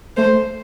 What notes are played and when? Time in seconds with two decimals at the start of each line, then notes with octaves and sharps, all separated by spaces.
0.17 A3 C5